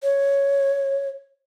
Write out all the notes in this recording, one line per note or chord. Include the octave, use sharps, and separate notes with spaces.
C#5